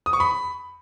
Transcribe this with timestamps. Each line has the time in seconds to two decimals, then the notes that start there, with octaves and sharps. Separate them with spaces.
0.06 D#6
0.13 C#6
0.20 B5